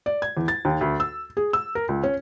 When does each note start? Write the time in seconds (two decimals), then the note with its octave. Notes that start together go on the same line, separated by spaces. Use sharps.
0.06 D5
0.22 G#6
0.37 E2
0.48 A6
0.65 D#2
0.81 D2
1.00 E6
1.37 G#4
1.53 E6
1.75 A#4
1.89 C#2
2.03 C#4